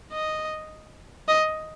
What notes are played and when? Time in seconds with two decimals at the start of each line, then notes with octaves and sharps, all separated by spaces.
0.12 D#5
1.28 D#5